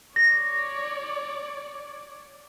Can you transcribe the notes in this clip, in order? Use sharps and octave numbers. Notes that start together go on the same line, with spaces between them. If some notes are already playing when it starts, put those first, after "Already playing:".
C#5 D5 A#6